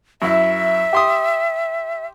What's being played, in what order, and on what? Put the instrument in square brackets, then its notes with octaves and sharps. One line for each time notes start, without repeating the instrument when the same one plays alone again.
[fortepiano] F#2 E4 [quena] E5
[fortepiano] G4 C6 D#6